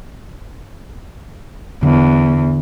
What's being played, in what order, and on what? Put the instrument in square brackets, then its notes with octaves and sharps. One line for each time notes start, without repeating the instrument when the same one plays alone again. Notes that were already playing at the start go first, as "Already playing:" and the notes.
[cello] E2 [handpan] D3